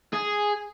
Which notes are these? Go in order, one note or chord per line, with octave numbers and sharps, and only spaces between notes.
G#4